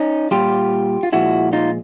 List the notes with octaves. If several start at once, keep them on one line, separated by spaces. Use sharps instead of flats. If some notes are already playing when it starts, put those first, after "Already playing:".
Already playing: C#4 D#4
A#2 G3 F4 G4
F4
A#2 F3 G#3 E4 F#4
D#4 F4